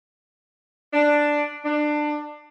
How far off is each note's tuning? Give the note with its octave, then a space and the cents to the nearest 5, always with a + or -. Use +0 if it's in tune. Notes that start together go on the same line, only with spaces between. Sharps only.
D4 +5
D4 +20